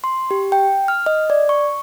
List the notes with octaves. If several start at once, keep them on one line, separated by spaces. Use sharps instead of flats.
C6
G4
G5
F6
D#5
D5
C#6